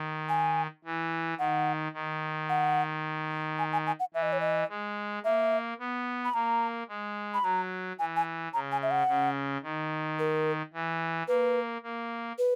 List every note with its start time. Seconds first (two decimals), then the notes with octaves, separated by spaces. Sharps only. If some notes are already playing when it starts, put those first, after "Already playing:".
Already playing: D#3
0.29 G#5
0.85 E3
1.39 D#3 F#5
1.94 D#3
2.49 F#5
3.59 G#5
3.73 G#5
3.87 G#5
4.00 F#5
4.14 E3 E5
4.22 D#5
4.33 C#5
4.41 D#5
4.70 G#3
5.24 A#3 E5
5.79 B3
6.25 B5
6.34 A#3 A#5
6.89 G#3
7.34 B5
7.43 F#3 A#5
7.99 E3 G#5
8.16 G#5
8.54 C#3 A#5
8.72 G#5
8.83 E5
8.91 F#5
9.08 C#3
9.63 D#3
10.19 A#4
10.74 E3
11.28 A#3 B4
11.83 A#3
12.38 B4